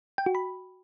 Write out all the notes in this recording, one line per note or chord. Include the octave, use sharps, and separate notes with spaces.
G5
F#4
B5